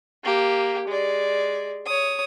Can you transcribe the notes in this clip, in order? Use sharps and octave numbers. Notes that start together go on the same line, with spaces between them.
A#3 G4
G#3 D5
C#5 D#6